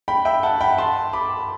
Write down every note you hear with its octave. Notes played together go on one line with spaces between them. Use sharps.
G5 B5
E5 G5
F#5 A5
G5 B5
A5 C6
B5 D6